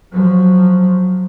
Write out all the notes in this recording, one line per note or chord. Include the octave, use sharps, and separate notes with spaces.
F3 F#3